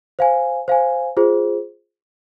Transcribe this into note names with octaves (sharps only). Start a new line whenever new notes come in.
C5 F5 G#5
C5 F5 G#5
F4 G#4 C5